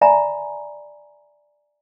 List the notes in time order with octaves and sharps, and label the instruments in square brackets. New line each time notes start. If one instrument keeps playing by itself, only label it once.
[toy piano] D5 E5 G#5 A#5 B5